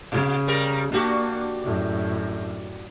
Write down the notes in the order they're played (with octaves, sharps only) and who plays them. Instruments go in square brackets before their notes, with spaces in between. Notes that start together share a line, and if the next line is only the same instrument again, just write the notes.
[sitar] A#2 [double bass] C#3
[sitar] G3 A#4
[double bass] A#3 [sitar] D4 F#4 G4
[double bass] F#2 A2